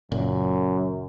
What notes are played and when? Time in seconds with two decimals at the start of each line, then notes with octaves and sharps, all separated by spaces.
0.12 F#1 F#2 A#2